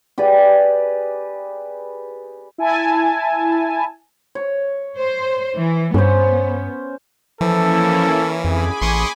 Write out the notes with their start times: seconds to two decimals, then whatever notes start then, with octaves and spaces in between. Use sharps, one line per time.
0.18 G4 G#4 B4 D5
2.58 E4 G#5 A5
4.35 C#5
4.98 C5
5.56 E3
5.94 G2 B3 C#4 C5
7.41 E3 F3 A#3 C#4 E4 A4
8.44 F2 G#4 G#5 B5 D6
8.82 A1 C6 C#6 D#6